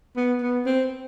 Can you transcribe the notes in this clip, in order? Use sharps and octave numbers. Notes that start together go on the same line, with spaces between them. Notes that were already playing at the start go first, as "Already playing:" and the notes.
B3
B3
C4